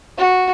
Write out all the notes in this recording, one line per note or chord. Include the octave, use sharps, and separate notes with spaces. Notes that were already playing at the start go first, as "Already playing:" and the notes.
F#4